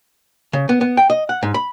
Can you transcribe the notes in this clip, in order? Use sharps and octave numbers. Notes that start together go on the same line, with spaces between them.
C#3
B3
B3
G5
D#5
F#5
G#2
B5